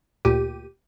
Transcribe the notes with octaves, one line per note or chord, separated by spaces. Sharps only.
D2 A#2 G4 D#7